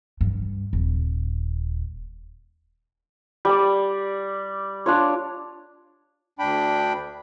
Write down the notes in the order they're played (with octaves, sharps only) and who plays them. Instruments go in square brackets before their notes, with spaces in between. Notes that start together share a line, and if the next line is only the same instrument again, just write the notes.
[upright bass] G2
D#1
[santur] G3 D5
D4 F4 C#5
[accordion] D2 D4 G5 B5